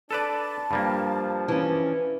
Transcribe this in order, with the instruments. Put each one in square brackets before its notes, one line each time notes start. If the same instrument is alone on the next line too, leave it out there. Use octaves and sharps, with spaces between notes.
[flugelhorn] D4 [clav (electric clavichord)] A4 B4 D5 [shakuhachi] A5
[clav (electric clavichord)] G2 G3 A#3 [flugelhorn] F3
[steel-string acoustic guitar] E3 C#4